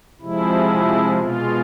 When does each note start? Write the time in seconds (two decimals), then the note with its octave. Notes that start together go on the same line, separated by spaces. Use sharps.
0.21 C3 F3 G#3 E4
1.18 B2 G#3 F4